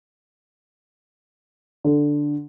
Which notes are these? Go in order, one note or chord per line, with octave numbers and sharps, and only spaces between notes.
D3